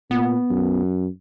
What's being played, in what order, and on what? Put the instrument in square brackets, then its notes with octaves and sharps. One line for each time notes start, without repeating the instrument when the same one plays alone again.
[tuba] A#2 [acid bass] B3
[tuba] F#2